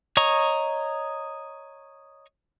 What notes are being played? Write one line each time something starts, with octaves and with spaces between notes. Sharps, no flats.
C#5 D#5 A#5 C#6